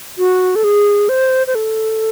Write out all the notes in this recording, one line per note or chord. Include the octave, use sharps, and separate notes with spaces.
F#4
A4
G#4
C5
C5
A4